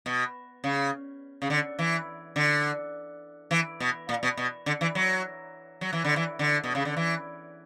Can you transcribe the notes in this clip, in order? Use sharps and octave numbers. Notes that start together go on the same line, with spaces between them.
B2
C#3
C#3
D3
E3
D3
E3
B2
A#2
B2
B2
D3
E3
F#3
F#3
E3
D3
E3
D3
B2
C#3
D3
E3